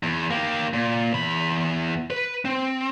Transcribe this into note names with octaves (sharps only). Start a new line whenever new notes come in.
E2
A#3 G4
A#2
E2 B5
B4
C4